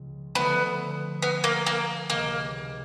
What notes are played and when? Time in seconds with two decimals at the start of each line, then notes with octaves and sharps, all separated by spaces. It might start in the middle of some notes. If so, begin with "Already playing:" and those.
Already playing: C#2 C#3 F3
0.35 D3 F3 A3 B3
1.22 B3
1.44 A#3
1.66 A#3
2.10 C#2 C3 D#3 A#3